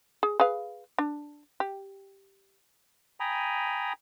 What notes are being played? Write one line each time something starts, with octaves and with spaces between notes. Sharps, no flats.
G#4
G#4 B4 F5
D4
G4
G5 G#5 A#5 B5 D#6